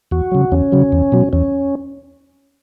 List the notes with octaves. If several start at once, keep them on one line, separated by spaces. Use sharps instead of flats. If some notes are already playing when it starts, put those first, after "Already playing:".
E2 F#4
C#3 F#3
E2 C#4
C#3 F#3
E2
B2 F#3
E2 C#4